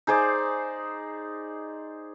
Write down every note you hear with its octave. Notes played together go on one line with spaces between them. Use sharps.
D#4 G#4 C5 D5